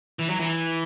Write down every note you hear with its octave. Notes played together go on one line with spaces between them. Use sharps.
E3
F#3
E3